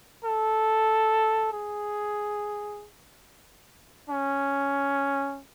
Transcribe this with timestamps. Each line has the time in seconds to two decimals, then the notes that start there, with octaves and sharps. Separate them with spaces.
0.24 A4
1.52 G#4
4.09 C#4